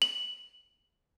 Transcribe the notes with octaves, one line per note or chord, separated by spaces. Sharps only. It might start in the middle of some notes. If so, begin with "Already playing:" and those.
F#7